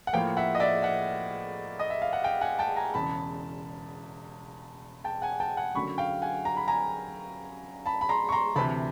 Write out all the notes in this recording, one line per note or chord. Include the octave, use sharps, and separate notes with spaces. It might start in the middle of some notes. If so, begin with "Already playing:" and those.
F#5
A2 F3 A#3 F5 G5
E5 F#5
D#5
D5 E5
E5 F#5
D#5
E5
F5
F#5
F5 G5
F#5 G#5
G5 A5
G#5 A#5
E1 E2 C#3 A5 B5
G5 A5
F#5 G#5
G5 A5
F#5 G#5
F#2 D3 F#3 B5 C#6
F5 G5
F#5 G#5
A#5
B5
G#5 A#5
A5 B5
B5
A#5 C6
C#6
A#5 C6
D2 C3 E3 A5 B5